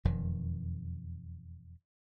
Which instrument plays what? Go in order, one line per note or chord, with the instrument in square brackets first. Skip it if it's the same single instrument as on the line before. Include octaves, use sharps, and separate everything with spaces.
[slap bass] E1 F2 D#3